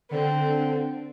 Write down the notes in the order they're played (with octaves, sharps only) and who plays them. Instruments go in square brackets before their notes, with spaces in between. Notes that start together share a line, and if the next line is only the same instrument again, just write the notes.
[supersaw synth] D3 [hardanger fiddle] C4